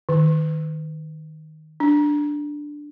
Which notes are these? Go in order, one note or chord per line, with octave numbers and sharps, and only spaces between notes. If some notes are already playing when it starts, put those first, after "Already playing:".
D#3
D4